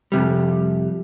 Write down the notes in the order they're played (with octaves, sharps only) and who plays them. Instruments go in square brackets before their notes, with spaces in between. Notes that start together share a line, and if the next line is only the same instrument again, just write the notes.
[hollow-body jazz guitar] F2 C3 G3